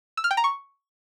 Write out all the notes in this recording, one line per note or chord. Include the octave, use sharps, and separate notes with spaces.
E6
F6
G5
A#5
C#6